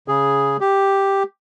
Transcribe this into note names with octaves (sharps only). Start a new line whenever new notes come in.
C#3 G#4
G4